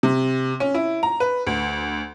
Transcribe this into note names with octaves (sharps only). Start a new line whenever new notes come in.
C3
C#4
E4
A#5
B4
D2